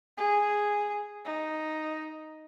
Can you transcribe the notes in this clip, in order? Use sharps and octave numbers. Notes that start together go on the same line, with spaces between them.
G#4
D#4